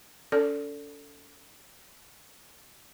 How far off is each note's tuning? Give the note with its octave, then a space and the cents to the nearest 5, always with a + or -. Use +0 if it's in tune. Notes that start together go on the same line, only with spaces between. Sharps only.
C#4 +45 A4 +15 D5 -20